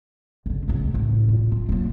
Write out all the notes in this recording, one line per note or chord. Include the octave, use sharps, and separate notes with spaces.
G1 C#3
C#2 A3
A1
A#2
F4
F#3 A#3